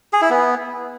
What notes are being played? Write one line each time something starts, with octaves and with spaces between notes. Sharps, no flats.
G#4
E4
B3